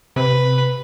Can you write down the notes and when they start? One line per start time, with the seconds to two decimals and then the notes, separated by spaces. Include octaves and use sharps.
0.16 C3 B4